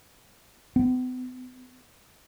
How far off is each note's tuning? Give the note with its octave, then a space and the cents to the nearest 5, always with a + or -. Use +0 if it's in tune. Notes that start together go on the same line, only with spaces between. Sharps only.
B3 +45